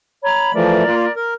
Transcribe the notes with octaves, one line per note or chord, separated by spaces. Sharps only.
C#5 A#5 B5
E3 F3 A3 A#4 D5
A#3 F4
A#4